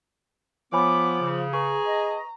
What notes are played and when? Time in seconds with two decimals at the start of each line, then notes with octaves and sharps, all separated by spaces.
0.73 F3 B3 C#5 G#5 B5 D6
1.21 C#3
1.53 G#4 B4 A#5 C#6
1.86 D#5